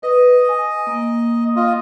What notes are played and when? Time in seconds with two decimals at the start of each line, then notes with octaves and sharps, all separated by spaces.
0.03 B4 D#5
0.49 G#5
0.87 A#3
1.56 F4 D#5